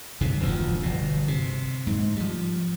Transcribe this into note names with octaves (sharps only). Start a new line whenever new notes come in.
G1 G2 C3
E1 D2 E3 F3
G1 B2
C3
G#2
F3 G3